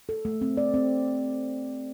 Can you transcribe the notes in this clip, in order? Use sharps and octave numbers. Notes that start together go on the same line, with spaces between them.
A4
A3
C4
D5
C4